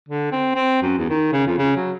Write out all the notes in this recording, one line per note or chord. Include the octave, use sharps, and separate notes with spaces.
D3
C4
C4
F#2
E2
D#3
C#3
F2
C#3
F#3